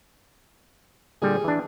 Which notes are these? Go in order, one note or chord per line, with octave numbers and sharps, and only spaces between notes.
A#2 D3 G3 G#4
E3 D4